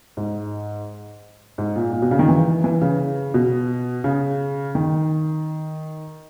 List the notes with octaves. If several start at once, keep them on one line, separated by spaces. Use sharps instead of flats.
G#2
G#2
A#2
A#2
B2
C#3
D#3
E3
E3
C#3
B2
C#3
D#3